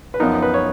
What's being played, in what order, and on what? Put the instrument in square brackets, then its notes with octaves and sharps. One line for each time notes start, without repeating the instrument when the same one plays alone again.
[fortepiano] B4
F#2 F3 B3 D#4 A#4
B4
C#5